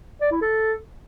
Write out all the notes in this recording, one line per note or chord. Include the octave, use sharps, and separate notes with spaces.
D5
E4
A4